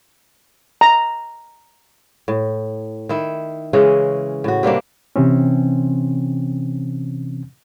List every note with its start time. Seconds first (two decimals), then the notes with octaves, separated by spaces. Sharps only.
0.81 A#5
2.28 A2
3.09 D#3 E4
3.73 C#3 E3 G#3 C#4
4.44 A2 F#4
4.63 C3 G3 A#3 D4
5.16 C3 E3 C4 C#4